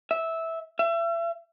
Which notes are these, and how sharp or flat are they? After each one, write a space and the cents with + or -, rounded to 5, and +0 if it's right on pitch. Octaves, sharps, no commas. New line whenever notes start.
E5 -10
E5 +35